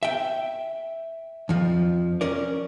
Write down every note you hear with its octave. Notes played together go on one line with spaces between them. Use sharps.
E5 G5
F2 F3
C#4 A#4 D5